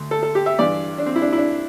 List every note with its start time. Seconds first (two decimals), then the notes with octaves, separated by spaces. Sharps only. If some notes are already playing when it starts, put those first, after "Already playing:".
Already playing: D2
0.11 A4
0.23 A4
0.35 G4
0.46 E5
0.59 G2 E3 D5
0.98 D4
1.06 C4
1.15 E4
1.22 D4
1.33 E4
1.38 D4